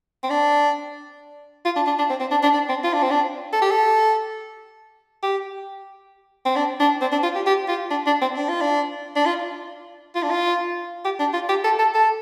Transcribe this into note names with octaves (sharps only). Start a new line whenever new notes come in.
C4
D4
F4
D4
D4
D4
C4
C4
D4
D4
D4
C4
F4
D4
C4
D4
A4
G4
A4
G4
C4
D4
D4
C4
D4
F4
G4
G4
F4
D4
D4
C4
D4
F4
D4
D4
F4
F4
D4
F4
G4
D4
F4
G4
A4
A4
A4